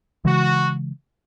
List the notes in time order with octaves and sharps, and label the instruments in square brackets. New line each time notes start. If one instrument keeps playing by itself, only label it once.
[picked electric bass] C#3 E3 G#3 [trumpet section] F#4